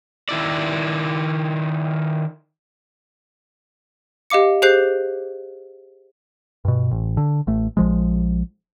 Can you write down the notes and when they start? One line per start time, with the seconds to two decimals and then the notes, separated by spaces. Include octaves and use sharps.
0.29 D#3 E4 D5
4.30 G4 D#5 F5 D6 C#7
4.62 G4 G#4 C5 F#6 G6 C7
6.65 G2 B2
6.91 A1
7.17 D3
7.47 A1 A3
7.77 A#1 F3 G#3